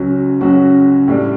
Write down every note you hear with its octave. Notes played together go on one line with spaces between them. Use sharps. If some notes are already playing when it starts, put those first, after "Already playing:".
Already playing: C#2 C#3 F#3 C#4 F#4
C#2 C#3 F#3 C#4 F#4
A2 G3 D4